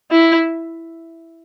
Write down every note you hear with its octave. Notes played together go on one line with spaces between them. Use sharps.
E4